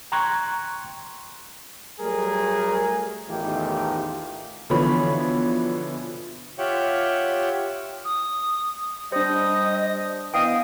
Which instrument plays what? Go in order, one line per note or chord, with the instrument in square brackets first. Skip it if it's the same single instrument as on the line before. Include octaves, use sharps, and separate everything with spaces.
[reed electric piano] G5 A#5 C6 C#6 F#6 G#6
[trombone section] F#3 G3 A3 G#4 A#4
A1 E2 D#3 A3 F4 G4
[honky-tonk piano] B2 D3 E3 F3 C#5 B5
[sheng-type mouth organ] F4 G4 C#5 E5 F#5 G5
[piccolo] D#6
[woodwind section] G3 D#5 [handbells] D4 C5 [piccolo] D#6
[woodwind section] E3 B3 D#6 [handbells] D#5 F5 G5